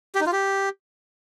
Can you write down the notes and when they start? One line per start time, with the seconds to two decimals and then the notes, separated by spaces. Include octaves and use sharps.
0.15 G4
0.21 D#4
0.26 F4
0.32 G4